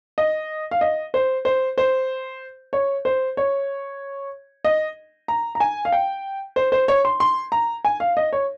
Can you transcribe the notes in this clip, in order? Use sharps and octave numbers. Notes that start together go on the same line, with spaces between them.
D#5
F5
D#5
C5
C5
C5
C#5
C5
C#5
D#5
A#5
A#5
G#5
F5
G5
C5
C5
C#5
C6
C6
A#5
G#5
F5
D#5
C#5